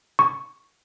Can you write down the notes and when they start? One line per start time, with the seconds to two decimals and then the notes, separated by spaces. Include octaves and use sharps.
0.19 C#6